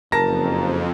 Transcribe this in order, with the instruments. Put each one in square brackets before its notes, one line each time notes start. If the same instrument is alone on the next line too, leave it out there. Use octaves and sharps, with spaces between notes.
[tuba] F#1 [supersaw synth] F2 [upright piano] A#4 A5 A#6